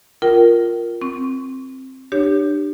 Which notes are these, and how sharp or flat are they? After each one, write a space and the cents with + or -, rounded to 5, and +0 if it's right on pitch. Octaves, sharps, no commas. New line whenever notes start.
F4 +0 A#4 +0 G5 -35
C4 +10 C#6 +25
D4 +30 G4 +0 C#5 +15